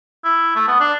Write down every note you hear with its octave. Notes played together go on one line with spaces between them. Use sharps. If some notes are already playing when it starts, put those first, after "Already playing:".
E4
A3
B3
D4